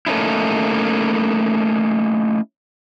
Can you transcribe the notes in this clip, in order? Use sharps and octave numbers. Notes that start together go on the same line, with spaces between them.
A3 A#3 C#4 D#4 E4